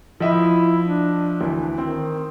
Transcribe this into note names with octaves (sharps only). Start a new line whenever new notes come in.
F3 E4 D#5 E5
D4
D2 E3
D#3 C4